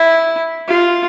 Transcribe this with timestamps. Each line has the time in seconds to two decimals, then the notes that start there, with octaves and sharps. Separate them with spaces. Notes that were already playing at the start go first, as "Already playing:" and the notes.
Already playing: E4
0.68 F4